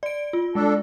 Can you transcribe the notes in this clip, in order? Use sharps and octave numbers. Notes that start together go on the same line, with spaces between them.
D5 D7
F4
G#3 D4 A4